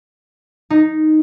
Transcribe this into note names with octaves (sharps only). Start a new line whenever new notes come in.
D#4